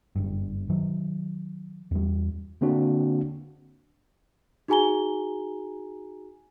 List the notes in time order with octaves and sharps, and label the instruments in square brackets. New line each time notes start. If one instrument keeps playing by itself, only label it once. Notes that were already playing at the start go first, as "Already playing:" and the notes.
[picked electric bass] F#1 G2
D#3 F#3
E2 G3
[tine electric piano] D3 A#3 C4 D4 F#4
[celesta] D#4 F#4 G#4 G#5 A#5 G7